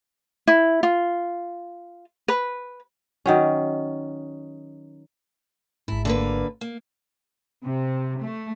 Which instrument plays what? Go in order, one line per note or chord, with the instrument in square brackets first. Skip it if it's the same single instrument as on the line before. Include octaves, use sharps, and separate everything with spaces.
[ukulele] E4
F4
B4
[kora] D#3 F#3 C#4
[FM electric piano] G#1 G#2 [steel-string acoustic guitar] E4
[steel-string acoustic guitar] D3 A#3 B4
A#3
[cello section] C3
A3